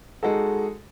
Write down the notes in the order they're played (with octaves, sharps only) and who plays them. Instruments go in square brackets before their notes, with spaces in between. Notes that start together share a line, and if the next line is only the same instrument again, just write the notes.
[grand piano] G#3 D#4 F#4 A4